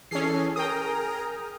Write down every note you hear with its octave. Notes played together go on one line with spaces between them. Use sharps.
E3 C#4 G#4 A4 C7
G#4 A#4 G5 A#5 D#6